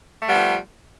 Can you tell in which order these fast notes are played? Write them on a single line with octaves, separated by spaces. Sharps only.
A3 G3 B3 F3